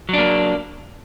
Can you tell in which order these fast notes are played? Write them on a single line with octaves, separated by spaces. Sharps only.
F#3 D4 A#3